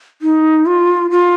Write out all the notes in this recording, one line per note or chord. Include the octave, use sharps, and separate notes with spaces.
D#4
F4
F4